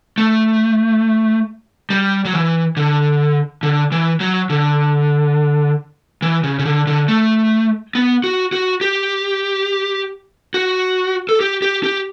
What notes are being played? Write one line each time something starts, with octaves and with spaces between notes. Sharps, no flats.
A3
G3
F#3
E3
D3
D3
E3
F#3
D3
E3
C#3
C#3
D3
D3
A3
B3
F#4
F#4
G4
F#4
A4
G4
G4
G4